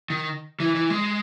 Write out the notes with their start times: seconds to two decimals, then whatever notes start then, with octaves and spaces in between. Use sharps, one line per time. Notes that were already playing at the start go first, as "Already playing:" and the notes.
0.10 D#3
0.60 E3
0.75 E3
0.90 G#3